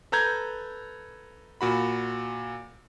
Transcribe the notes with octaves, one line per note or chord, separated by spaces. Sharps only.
A4 B4 A#5 G6 G#6
A#2 F#4 B5